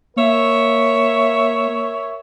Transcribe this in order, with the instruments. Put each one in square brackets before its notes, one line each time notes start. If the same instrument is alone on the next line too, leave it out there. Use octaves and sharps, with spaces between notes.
[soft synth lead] A#3 [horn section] A#4 C#5 E5